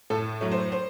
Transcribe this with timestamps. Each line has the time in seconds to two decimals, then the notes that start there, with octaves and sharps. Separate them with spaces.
0.10 A2 A4
0.41 F#3 A3
0.52 C5
0.72 C5